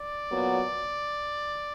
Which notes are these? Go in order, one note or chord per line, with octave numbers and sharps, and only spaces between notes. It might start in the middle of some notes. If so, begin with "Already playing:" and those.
Already playing: D5
A#2 F#3 B3